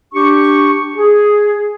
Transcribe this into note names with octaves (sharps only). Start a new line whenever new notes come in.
D4 G4 C#6
G#4